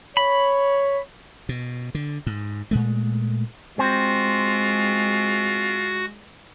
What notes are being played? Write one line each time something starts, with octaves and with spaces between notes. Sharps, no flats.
C#5 B5
B2
D3
G#2
A#2 G#3 A3
G#3 C4 F4 F#4